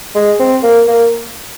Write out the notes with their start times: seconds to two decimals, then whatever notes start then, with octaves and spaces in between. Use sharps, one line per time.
0.15 G#3
0.40 C4
0.63 A#3
0.88 A#3